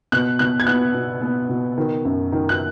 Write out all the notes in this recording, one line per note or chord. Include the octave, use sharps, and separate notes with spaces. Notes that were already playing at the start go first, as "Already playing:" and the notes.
B2 F#6
B2 F#6
G#6
B3 F#6
B2
B3
B2
D#3
F#2
D#3
F#6